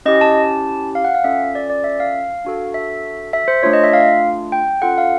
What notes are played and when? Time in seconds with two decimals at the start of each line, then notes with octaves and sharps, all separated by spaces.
0.05 C#4 E4 G4 D#5
0.21 A5
0.95 F5
1.04 F#5
1.15 F5
1.24 C#4 F4 A4 E5
1.55 D5
1.70 D5
1.84 E5
2.00 F5
2.45 D4 F#4 A4
2.74 E5
3.33 E5
3.48 C5
3.63 A3 D4 F4 C#5
3.73 D#5
3.84 E5
3.93 F5
4.52 G5
4.82 C#4 F4 A4 F#5
4.98 F5